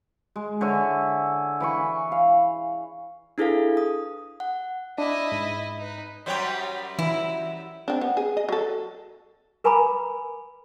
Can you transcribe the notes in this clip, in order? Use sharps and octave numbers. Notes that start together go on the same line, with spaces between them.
G#3
D3 C#5 E5 G#5
E3 B5 C#6
F5
D4 E4 G#4 A4 B4 F5
D#6
F#5
D4 E4 D#5
G#2
D#4 B4
F#2 F#3 G3 C5 C#5 G5
E3 E4
C4 D4
B3
G#4
D#5
F#3 A4
A#4 B4 G#5 A#5 B5 D6